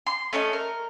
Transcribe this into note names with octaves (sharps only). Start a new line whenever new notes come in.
C6
A3 C#4 A4 D#5
A#4